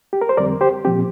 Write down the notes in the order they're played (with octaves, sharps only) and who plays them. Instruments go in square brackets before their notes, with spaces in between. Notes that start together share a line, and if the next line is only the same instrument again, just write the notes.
[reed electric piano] G4
A#4
C5
F2 D3 G3 C4 A#4 D5
G4 C5
A#2 F3 C4 G4